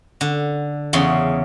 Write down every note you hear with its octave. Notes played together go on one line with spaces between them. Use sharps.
D3
E2 C#3 C6